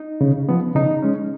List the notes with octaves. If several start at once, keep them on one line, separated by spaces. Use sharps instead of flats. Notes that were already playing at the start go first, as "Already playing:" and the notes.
Already playing: D#4
C#3
F3 B3
C#3 D#4
G#3 C#4